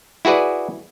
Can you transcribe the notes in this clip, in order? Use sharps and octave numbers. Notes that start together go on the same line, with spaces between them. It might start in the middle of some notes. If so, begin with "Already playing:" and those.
E4 F#4 G#4 B4 D5